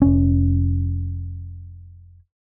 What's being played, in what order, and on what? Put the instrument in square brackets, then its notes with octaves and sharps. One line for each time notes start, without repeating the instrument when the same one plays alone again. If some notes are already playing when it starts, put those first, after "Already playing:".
[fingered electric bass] F1 C#4